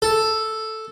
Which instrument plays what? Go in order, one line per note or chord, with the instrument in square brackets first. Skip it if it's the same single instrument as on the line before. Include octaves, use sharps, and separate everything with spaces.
[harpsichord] A4